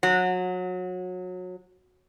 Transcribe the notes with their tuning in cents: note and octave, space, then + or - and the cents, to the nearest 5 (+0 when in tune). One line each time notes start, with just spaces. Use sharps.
F#3 -25